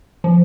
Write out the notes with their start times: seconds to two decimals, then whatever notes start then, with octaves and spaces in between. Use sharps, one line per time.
0.24 F3